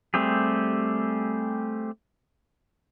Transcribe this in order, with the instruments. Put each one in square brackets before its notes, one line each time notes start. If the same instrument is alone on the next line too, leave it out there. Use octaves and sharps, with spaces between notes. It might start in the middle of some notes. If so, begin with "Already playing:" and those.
[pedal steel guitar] G3 A3 C4 G4 G#4